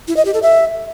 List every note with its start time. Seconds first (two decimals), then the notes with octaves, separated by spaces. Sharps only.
0.08 E4
0.17 D#5
0.25 G4
0.34 A4
0.42 E5